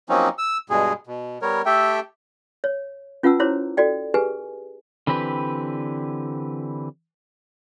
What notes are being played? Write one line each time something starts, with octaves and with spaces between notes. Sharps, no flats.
F3 F#3 A#3 C4 C#4 D#4
E6
G2 B2 G#3 G#4
B2
G3 B3 A#4 C#5
A3 G4 A4 E5 G5
C#5
C#4 F4 B4 F#5 A5 E6
E4 F#4 C5 C#5 A#5 D6
F#4 A4 D5 G5
G4 G#4 B4 G#5
D3 E3 C4 G4 B4